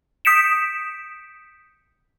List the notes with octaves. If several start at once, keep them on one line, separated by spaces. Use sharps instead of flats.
D#6 G6 B6 C#7 D7 E7